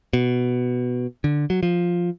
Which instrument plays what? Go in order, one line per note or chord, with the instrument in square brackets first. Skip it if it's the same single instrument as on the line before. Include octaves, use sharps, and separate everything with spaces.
[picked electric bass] B2
D3
F#3
F3